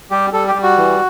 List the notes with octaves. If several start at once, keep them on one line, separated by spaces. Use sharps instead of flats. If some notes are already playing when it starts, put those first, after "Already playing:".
G3 G4
G3 A4
G4
G3
F#4
E3